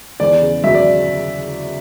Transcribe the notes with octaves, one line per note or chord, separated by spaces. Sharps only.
E2 D5
C#3
F#3 E5
D5